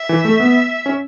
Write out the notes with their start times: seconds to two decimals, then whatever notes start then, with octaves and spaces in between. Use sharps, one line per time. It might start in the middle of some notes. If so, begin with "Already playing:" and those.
Already playing: E5
0.09 E3
0.25 A3
0.40 B3
0.86 C#4